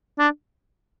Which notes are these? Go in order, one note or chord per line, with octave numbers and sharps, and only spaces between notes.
D4